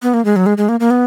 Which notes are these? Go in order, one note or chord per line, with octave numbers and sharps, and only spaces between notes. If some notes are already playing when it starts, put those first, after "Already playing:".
B3
A#3
G#3
F#3
G#3
G#3
A#3
A#3
B3